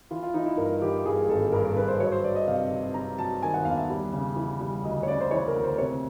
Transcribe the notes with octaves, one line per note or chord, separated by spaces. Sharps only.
E3 F4
F4
E3 D#4
E4
G2 A#4
E3 G4
G2 G#4
G#1 A4
G2 A#4
A#4
G2 B4
C5
F#3 C#5
C5
F#3 D5
D#5
C3 F5
C3
C3 A#5
F#3 A5
D#3 G#5
F#5
E2 F5
E5
G3
C#3
E3
G3
D2 D#5
C#5
C#3 D5
C5
E3 C#5
A#4
D2
C5
C3 C#5